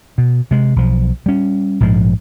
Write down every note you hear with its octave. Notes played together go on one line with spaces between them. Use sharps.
B2
C3 G#3
B1 F3
G3 C#4
A#1 G#2 F3 G#3